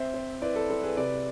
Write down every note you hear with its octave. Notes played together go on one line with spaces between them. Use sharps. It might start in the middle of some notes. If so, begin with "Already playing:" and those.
Already playing: C4 C5 E5
C4
E4 B4 D5
A4
C4 A4
G#4 B4
C3 B4 D5